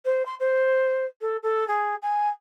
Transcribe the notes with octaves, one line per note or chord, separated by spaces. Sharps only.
C5
C6
C5
A4
A4
G#4
G#5